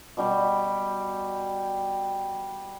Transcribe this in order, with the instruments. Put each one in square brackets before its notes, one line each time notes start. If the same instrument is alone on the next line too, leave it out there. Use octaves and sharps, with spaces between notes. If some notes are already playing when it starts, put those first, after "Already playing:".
[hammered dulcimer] B2 G3 G4